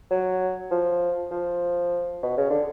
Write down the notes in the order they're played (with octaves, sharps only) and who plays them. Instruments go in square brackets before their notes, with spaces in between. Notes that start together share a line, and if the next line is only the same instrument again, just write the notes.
[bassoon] F#3
F3
F3
B2
C#3
D3